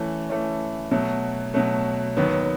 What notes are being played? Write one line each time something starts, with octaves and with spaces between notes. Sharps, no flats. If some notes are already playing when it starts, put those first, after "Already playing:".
Already playing: E3 A3 C#4
E3 A3 C#4
B2 F#3 A3
B2 F#3 A3
D#2 D#3 F#3 B3